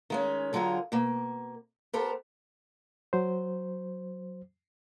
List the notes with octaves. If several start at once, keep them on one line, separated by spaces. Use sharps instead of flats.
D#3 G#3 C#4
D3 F#3 F4 G#4 A#4
B2 A#3
B3 G4 A4 A#4 C5
F#3 C5